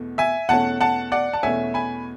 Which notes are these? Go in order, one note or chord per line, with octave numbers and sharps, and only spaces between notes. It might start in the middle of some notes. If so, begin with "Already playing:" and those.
Already playing: E2 B2 A3
E5 G#5
E2 B2 A3 C#4 F#5 A5
F#5 A5
D5 F#5
A5
E2 B2 A3 C#4 E5 G#5
G#5 B5